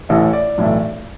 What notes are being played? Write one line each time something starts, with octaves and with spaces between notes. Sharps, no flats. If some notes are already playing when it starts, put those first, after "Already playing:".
A1 A2 E3 A3
D5
B1 A2 E3 A3